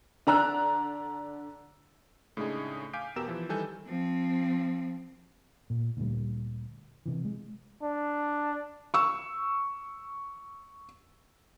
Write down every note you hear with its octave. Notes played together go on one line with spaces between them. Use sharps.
D3 D4 A#5 E6 F#6
A2 C#3 G#3 D4 D#4 G#4
F5 G#5 D6 G6 B6 D7
E2 B2 G4 A#4 E6 E7
E3 F3
D#3 E3 G3 A4 G#5 G6
F3 C4
A#2
D2 A#2 G3
C3 E3
G#3
D4
C#6 E6